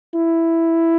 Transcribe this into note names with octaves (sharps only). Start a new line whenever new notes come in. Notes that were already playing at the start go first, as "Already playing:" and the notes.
E4